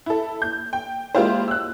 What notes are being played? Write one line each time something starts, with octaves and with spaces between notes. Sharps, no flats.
E4 A4
G6
G5
G#3 A#3 E4 F4 G4 C5
E6 F#6